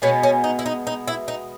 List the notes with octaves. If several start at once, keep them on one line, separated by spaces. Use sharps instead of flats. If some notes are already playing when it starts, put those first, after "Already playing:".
B2 G#3 B3 C#4
C#4
D#4
E4
D#4
D#4
E4
D#4